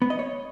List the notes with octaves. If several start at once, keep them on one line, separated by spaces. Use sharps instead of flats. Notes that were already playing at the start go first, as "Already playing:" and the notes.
B3
D#5
C#5